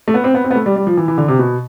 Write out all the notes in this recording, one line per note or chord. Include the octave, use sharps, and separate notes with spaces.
A3
B3
C4
B3
C4
B3
A3
G3
G3
F3
E3
E3
D3
C3
B2